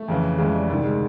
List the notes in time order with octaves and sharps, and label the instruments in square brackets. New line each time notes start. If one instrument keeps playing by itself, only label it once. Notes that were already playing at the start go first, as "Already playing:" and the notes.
Already playing: [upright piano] A3
F2 C#3 E3
F2 C#3 E3 G#3
G3
D2 C3 D#3 G3
G#3